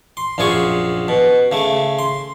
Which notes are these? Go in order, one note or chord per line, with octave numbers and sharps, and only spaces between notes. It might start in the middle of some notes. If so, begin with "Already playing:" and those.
C6
A#1 F#2 F4 G#4 C#6
B2
C#3 A3
C6